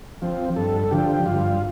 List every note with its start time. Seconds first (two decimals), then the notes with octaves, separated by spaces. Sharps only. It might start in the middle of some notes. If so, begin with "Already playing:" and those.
0.22 F3 C4
0.56 G2 A4
0.91 D3 F3 G4
1.26 G2 F4